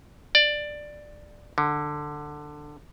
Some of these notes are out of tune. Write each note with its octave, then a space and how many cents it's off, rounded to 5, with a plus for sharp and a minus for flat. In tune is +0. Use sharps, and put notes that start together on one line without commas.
D5 +10
D3 +15